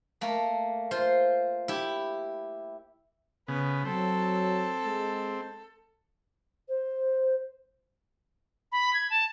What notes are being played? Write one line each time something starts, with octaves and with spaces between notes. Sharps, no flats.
A3 A#3
F4 C5
E4 G4
C#3 B3 B4
F#3 C4 A4
G#3
C5
B5
G#6
A5